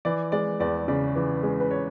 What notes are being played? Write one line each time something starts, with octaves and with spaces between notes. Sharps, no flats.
E3 D5
G#3 D5
E2 D5
C#3 D5
E3
G#3
B4
C#5